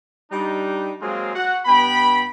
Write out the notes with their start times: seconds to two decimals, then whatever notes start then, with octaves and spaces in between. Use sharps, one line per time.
0.31 G3 D4 D#4
1.01 F#3 G#3 A#3 C4 F4 G#4
1.36 F#4 F#5
1.66 G2 B3 G5 B5